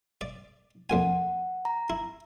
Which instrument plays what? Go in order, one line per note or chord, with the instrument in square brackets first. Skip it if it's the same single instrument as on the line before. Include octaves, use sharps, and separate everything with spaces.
[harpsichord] D5
[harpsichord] F2 A#2 G#5 [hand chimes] F#5
[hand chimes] A#5
[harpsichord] E4